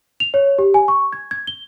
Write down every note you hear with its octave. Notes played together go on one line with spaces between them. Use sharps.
F7
C#5
G4
G#5
C#6
G#6
G#6
G7